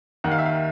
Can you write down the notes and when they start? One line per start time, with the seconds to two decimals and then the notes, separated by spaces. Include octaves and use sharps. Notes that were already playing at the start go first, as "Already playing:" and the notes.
0.24 D#2 D#3 F#5
0.31 F5
0.38 E5
0.46 F5